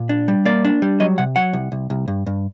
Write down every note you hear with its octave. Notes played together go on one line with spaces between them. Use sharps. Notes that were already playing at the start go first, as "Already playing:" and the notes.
Already playing: A#2
D4
G3
A#3 D5
D4
G3
F#3 D#5
C3 F#5
F#3 F#5
C2
C2
C2
G2
G2